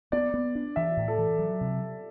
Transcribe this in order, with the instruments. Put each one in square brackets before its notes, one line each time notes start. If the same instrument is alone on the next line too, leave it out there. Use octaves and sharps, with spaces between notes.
[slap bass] B3 [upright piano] D5
[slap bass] B3
D4
[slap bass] E3 [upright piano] E5
[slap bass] A2
[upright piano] A4
[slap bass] E3
F#3
C3